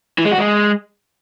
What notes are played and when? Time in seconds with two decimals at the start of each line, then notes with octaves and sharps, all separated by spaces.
0.19 E3
0.25 G#3
0.32 F#4
0.39 G#3